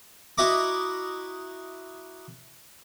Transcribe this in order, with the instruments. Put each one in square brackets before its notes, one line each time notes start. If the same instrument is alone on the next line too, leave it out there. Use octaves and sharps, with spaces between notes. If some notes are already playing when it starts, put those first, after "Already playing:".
[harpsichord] E4 F#4 D#5 E5 A#5 D6